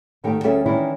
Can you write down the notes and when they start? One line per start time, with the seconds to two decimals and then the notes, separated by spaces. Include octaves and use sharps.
0.24 G#2 D#3 A3 G4 G5
0.44 D2 G3 C#4 G#4 A4 E5
0.66 D#3 E3 G#3 C#4 D4 E4